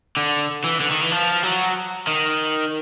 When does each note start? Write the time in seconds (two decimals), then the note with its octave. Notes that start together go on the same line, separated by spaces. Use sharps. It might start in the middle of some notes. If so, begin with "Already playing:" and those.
0.17 D3
0.64 E3
0.80 D3
0.91 D#3
1.01 E3
1.12 F3
1.44 F#3
2.07 D#3